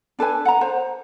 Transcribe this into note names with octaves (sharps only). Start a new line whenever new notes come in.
D4 A4 B4 G#5
F#5 A#5
C5